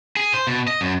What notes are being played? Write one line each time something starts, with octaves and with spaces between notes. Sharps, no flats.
G#4
C5
B2
D#5
F#2